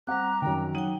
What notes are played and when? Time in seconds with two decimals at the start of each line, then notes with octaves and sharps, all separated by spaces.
0.07 G3 C4 F#5 A#5 D6 F#6
0.42 F#2 D#3 G5
0.75 F#3 D#4 F#5 G5 D#7